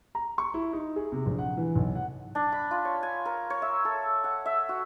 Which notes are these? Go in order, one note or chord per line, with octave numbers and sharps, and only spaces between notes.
A#5
C#6
E4
D#4
G#4
C3
A#1
F#5
E3
B1
F#5
D4
B5
F4
C#5
G#5
A#4
C#5
E5
A4
F#5
E5
F#4